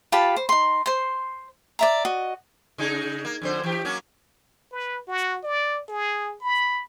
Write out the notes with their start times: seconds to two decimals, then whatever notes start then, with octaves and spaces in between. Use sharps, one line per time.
0.12 F4 G4 A5 B5
0.36 C5
0.49 D#4 C6
0.86 C5 C6
1.79 D5 E5 A#5
2.05 F#4 D#5
2.78 C#3 D#4 G#4
3.25 A#3
3.42 F2 D3 C5
3.63 E3 G4
3.85 F#3 A#3 C#4
4.72 B4
5.08 F#4
5.44 D5
5.89 G#4
6.41 B5